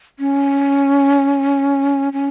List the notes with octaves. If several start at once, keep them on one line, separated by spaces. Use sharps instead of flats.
C#4
C#4